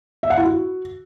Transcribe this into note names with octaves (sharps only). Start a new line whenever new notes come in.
E5
F#5
E4
F#4